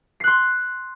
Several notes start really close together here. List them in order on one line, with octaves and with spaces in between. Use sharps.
C7 F#6 C6